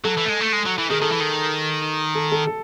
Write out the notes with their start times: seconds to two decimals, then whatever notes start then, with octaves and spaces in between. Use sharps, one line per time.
0.04 F#3 A4
0.17 E3
0.25 A3
0.29 G#3
0.41 A3
0.52 G#3
0.66 F#3
0.78 E3
0.90 D#3 G#4
1.01 D#3 A4
1.11 E3
1.20 D#3
2.15 A4
2.32 A4
2.47 A4